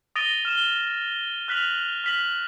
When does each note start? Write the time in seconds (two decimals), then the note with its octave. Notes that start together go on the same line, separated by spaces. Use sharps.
0.16 D#6 A6 A#6 D7 D#7 G7
0.45 F6 E7 G7
1.48 F6 F#6 B6 F7 F#7
2.04 F6 B6 F#7